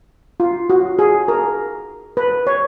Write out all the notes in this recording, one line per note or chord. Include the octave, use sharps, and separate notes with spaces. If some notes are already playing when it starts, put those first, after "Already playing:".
F4
F#4
G#4
A#4
B4
C#5